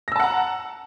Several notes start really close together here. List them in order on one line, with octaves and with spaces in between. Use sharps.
A#6 E6 A5 F#5 A#5